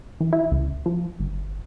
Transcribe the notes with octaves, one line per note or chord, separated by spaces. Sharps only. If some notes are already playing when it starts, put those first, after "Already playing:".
E3
E4
C#2
F3
G1